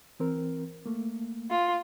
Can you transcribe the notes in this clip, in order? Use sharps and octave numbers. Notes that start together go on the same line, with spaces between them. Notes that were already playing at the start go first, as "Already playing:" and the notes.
E3 C4 A#4
A3 A#3
F4